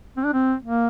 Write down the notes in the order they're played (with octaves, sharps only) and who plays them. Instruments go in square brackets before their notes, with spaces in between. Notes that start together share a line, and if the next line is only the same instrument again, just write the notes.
[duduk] C4
D4
C4
A#3